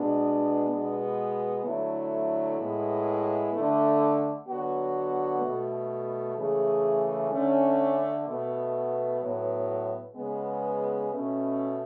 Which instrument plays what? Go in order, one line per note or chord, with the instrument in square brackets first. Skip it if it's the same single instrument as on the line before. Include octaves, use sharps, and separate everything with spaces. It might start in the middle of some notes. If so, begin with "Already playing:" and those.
Already playing: [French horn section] B2 G#3 B3 D4
B2 G#3 B3
D3 F#3 A3 E4
A2 G#3 B3
D3 A3
D3 F#3 B3 F#4
B2 A3
C#3 E3 A3 G#4
D3 A3 C#4
B2 A3 B3
A2 F#3 B3
C#3 G#3 B3
B2 A3 C#4